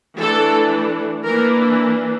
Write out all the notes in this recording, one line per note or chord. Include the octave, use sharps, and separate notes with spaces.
E3 A3 D4 A4
E3 A#3 D4 A#4